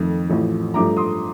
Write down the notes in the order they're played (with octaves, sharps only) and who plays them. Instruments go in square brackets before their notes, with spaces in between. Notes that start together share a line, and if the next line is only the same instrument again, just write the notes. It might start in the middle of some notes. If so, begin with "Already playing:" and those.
Already playing: [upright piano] F2 D#3 A3
A1 A2 F3 A3
G2 F3 A3 D4 A#5 D6
C6 D#6